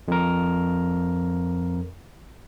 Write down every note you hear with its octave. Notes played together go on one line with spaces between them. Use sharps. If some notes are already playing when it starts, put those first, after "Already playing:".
F2 A#4